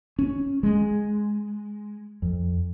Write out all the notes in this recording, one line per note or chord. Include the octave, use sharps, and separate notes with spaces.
C#4
G#3
F2